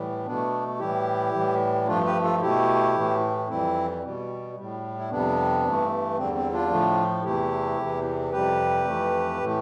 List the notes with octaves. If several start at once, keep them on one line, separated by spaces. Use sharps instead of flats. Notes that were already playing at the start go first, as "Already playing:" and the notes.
Already playing: A2 E3 G3
B2 A3 B3 D4
A2 E3 G3 E4 G4
A2 E3 G3
G2 F3 A3 D4 F4
G4 B4
F4 A4
B2 A3 E4 G4
A2 E3 A3
F2 E3 G3 C4 E4
B2 G3
A2 G3
E4
F2 C3 G3 B3 D4
G2 E3 A3
E2 D3 G3 C4
C4
D4 F4
A2 F3 A3
E2 C3 E3 A3 E4 G4
E2 C3 E3
F2 C3 G3 G4 B4
F2 E3 A3
A2 E3 A3